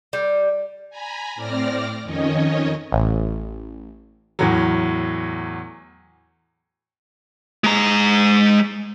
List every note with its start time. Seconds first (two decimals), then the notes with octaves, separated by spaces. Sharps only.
0.13 G3
0.90 G#5 A#5 B5
1.36 A2 C4 D5 D6 F6 A#6
2.04 F2 D#3 C#4 C#5 D#5
2.92 A1
4.39 E2 A2 F#3
7.64 G#3 A#5